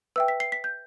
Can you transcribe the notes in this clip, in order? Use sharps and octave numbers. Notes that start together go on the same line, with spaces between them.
B4 E5 G5 E6
B6
C7
B6
G6